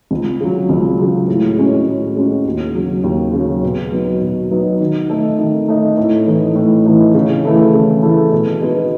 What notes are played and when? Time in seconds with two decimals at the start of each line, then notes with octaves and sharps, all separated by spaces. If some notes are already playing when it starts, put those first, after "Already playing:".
0.11 C#2
0.41 C#3 F#3
0.69 C#2
0.99 C#3 F#3
1.28 A2
1.57 G#3 C#4 F#4
1.87 A2
2.16 G#3 C#4 F#4
2.46 D#2
2.75 C#3 F#3
3.04 D#2
3.33 C#3 F#3
3.63 B2
3.92 F#3 B3 D#4
4.21 B2
4.51 F#3 B3 D#4
4.80 D#3
5.10 A3 D#4 A4
5.39 D#3
5.68 A3 D#4 A4
5.97 A2
6.27 E3 A3 D#4
6.55 A2
6.85 E3 A3 D#4
7.14 C#3
7.44 E3 A3 E4 A4
7.73 C#3
8.03 E3 A3 E4 A4
8.32 B2
8.61 G#3 B3 D#4 F#4